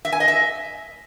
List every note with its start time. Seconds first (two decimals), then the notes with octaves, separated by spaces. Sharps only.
0.05 E5
0.12 G#5
0.20 D#5
0.28 E5